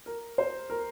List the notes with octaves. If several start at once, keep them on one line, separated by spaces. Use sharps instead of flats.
A#4
C5
A#4